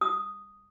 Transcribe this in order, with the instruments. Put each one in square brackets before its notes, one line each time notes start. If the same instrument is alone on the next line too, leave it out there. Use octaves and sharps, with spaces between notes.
[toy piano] D#6